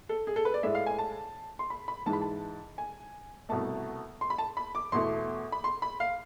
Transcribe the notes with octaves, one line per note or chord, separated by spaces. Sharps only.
A4
G#4
A4
B4
D5
A2 G#3 E5
F5
G#5
A5
C6
B5
B5
G#2 E3 G#3 A5
B5
A5
G#5
C2 B2 A3 A5
C6
B5
A5
B5
D6
E2 B2 A3 C6
B5
C6
B5
F5